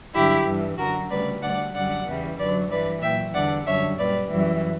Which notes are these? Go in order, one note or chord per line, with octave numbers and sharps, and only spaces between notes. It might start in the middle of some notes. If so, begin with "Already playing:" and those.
G2 D3 F#3 E4 G4
G2 E3 G3
F#2 D3 F#3 F#4 A#4
D2 C#3 G3 B4 D5
D2 D3 G3 D5 F#5
F#2 D3 G3 D5 F#5
E2 C#3 E3 G3
F#2 D3 F#3 B4 D5
G2 E3 G3 B4 D5
A#2 F#3 E5 G5
E2 D3 G3 D5 F#5
F#2 D3 G3 C#5 E5
A#2 G3 B4 D5
F#2 E3 G3